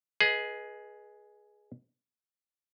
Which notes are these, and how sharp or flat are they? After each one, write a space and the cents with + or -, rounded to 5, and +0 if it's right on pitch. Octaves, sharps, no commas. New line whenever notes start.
G#4 +10 B4 -20 D#5 +0